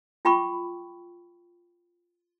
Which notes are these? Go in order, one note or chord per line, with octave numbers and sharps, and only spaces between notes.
F4 G5 B5 C#6 D6